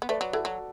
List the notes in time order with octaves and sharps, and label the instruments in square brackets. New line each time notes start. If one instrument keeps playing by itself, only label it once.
[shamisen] B3
[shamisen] A3 [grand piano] B4 D5
[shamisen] F#3
[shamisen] E3 [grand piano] F#4 A4
[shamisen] F#3